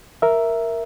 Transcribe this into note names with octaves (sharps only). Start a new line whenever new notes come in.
A#4 E5